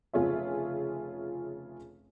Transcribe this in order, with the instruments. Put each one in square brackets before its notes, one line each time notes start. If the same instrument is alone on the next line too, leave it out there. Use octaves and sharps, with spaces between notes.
[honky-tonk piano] F1 C#3 F4 G#4 C#5 E5